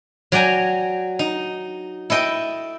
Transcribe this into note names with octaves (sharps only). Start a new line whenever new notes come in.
F#3 D5 G5 G#5 A#5
D#4
E4 A4 D#5 G5